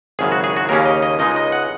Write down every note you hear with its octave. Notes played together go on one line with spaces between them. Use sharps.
G#1 F#2 C#3 G#4
F#4
G#4
F#4
D#2 C#3 A#3 C#4 A#4
D#5
D#5
C#2 C#3 G#3 D#4 D#5
D#5
F#5